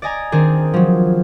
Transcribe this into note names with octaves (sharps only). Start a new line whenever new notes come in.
D5 D#5 G#5 A#5
D#3 C4 D4 G#4
F3 F#3